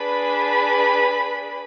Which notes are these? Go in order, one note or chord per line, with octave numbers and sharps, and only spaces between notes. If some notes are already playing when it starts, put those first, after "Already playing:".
Already playing: D4 G#4 B4 B5